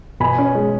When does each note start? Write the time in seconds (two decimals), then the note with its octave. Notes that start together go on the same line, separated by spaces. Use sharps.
0.20 B2 G#5 B5
0.38 C#4
0.55 G#3